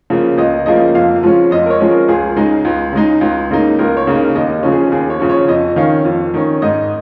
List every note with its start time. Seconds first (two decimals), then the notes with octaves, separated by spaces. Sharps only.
0.10 C#3 F3 A#3
0.38 C#2 D#5
0.66 C#3 F3 A#3 D#5
0.95 F2 F5
1.23 F3 G#3 C#4
1.51 F2 D#5
1.66 A#4
1.70 C#5
1.80 F3 G#3 C#4
1.90 A#4
2.08 C#2 G#4
2.36 C#3 G#3 D#4
2.65 C#2
2.93 C#3 G#3 D#4
3.21 C#2
3.51 C#3 A#3 D#4
3.79 C#2 A#4
3.97 C#5
4.07 C#3 A#3 D#4
4.16 A#4
4.35 D#2 D#5
4.63 C#3 F3 C#4
4.72 G#4
4.92 D#2 G#4
5.10 C#5
5.20 C#3 F3 C#4
5.29 C#5
5.48 F2 D#5
5.76 D#3 C#4 F5
6.05 F2
6.34 D#3 C#4
6.62 G#2 D#5